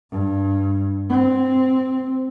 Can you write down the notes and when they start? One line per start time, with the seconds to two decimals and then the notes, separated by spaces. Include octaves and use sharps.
0.11 G2
1.10 C4